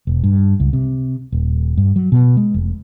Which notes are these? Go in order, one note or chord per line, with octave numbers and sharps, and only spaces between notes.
E1
G2
C#2
C3
D#1
G2
F#3
B2
G#3
F1